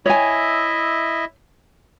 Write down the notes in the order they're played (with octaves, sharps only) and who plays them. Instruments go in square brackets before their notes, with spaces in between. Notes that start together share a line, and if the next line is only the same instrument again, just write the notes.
[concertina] E4 D#5 E5 [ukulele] C#5 G#5